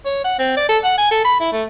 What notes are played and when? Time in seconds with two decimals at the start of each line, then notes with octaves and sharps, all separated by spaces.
0.05 C#5
0.24 F#5
0.39 C4
0.57 D5
0.69 A4
0.84 F#5
0.98 G#5
1.11 A4
1.25 B5
1.40 E4
1.53 A3